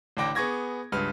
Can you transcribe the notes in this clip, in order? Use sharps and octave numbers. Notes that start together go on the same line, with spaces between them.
A1 D3 D4 G5 D6 A#6
B3 G#4 C#6 G#6 A#6
C#2 G2 B4 F6